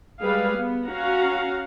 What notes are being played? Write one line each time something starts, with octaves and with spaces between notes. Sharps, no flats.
G3 G#3 G#4 B4 F5
B3
C#4 F#4 F5 F#5 A#5